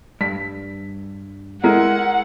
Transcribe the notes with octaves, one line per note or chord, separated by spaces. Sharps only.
G2 B6
G#3 E4 A#4 F#5